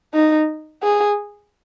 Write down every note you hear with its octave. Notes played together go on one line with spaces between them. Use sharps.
D#4
G#4